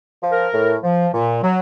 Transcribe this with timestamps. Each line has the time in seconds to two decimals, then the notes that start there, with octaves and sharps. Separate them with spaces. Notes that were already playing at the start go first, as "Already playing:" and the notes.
0.21 F3
0.31 A#4
0.52 A2
0.83 F3
1.13 A#2
1.43 F#3